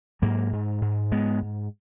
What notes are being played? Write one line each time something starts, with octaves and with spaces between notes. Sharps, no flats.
G#2 F#3 A#3
G#2
G#2
G#2 G#3 B3
G#2